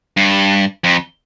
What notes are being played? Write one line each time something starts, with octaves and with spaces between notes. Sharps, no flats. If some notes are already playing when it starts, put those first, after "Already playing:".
G2
F2